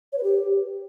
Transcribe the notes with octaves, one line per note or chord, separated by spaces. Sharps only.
C#5
B4
G4